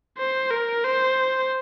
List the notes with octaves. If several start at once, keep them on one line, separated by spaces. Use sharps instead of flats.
C5
A#4
C5